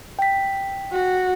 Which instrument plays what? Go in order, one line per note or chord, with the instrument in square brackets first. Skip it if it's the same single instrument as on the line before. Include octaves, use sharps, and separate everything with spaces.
[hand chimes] G5 B6
[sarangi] F#4